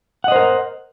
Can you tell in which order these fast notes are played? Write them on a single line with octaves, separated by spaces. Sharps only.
F#5 D#5 C5 A#4